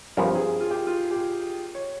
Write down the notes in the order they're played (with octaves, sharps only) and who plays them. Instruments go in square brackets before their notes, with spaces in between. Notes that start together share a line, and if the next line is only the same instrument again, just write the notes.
[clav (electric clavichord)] G2 F3 C4 [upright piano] A#4
[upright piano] G#4
F4
G4
F4
G4
C#5